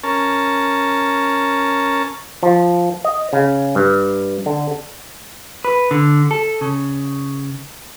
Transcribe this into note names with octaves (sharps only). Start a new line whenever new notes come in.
C#4 A#4 A5
F3
D#5
C#3
G2
D3
B4
D3
A4
C#3